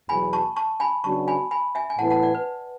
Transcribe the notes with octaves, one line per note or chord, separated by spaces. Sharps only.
E2 B2 F#3 G#5 B5
A5 C#6
A5 C#6
G#5 B5
C#3 F#3 B3 D4 F#4 A5 C#6
G#5 B5
G#5 B5
E5 G#5
G#5
A2 E3 B3 E4 B4 F#5 A5
F#5 A5
D5 F#5
B4